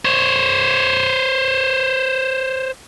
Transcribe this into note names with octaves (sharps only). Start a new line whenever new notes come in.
C5 C#5